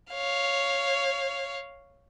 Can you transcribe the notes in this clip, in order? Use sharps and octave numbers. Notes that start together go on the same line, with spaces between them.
C#5 F5